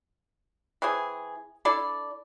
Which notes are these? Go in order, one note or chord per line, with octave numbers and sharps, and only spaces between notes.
E3 C4 G#4
D4 E4 A4 D5